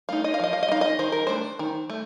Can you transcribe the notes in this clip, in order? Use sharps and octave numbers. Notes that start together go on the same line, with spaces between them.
A3 D#4 F5
D#5
F5
F3 D#5
F5
D#5
A3
D#4 F5
D#5
D#3 C5
A#4
A3 D4 C5
D#3
A3